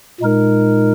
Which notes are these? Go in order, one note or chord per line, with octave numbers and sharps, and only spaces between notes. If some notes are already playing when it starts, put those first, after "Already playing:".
A#2 G#3 D#4 A#4